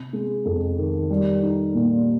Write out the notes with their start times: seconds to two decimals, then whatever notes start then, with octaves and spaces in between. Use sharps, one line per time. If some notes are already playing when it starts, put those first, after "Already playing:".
Already playing: C3
0.13 G#3
0.45 F2
0.78 D#3
1.10 G3
1.43 D#4
1.74 A#2